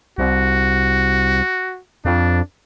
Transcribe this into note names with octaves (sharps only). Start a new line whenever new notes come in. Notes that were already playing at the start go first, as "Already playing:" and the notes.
C2 F#4
F2 D4